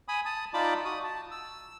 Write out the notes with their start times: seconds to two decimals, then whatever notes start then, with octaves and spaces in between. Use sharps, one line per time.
0.08 G#5 B5 D#6
0.25 A5 D#6
0.54 D#4 F4 D5 A5 B5 D6
0.85 F#4 D#6
1.04 A5
1.31 E6